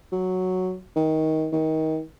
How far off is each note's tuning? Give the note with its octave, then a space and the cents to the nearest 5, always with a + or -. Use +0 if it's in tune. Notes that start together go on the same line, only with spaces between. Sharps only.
F#3 +0
D#3 +20
D#3 +25